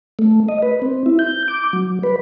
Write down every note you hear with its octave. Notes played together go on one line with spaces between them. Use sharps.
A3
D#5
B4
C4
E4
G6
D6
F#3
B4